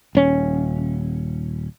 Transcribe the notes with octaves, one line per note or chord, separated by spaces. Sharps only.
D#1 C#4